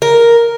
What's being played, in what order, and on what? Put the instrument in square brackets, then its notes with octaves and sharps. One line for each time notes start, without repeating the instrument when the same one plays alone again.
[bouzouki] A#4